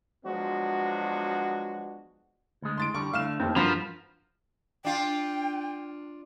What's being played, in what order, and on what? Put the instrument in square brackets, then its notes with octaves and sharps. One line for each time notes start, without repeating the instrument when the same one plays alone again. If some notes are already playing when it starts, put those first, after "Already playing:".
[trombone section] F3 F#3 G#3 B3 D4 F#4
[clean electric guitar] D2 G#3
[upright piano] C6 A6 D7
[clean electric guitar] D3 G3 [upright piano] C#6
[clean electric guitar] D3 A3 [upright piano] F5 F6 E7
[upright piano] F1 D#2 [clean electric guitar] C4
[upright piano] G2 C6 A6 [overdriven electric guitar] F3 [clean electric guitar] F#4 A#4 B4
[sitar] D4 F4 [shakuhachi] G5